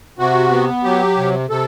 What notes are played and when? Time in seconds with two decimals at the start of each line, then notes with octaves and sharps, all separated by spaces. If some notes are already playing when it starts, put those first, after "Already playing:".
0.19 C3 F#4
0.51 B3
0.84 F#3 G4
1.17 C3
1.50 C3 A4